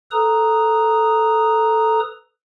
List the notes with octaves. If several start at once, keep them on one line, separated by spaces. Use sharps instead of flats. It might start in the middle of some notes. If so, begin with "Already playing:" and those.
A4 B4 A#5 D#6